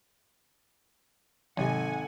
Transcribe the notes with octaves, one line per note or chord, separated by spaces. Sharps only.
G#1 C3 F#3 A4 F#5 G#5